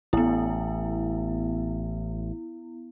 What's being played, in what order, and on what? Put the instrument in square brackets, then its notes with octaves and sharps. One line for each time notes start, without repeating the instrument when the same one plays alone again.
[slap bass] A1 [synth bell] B3 E4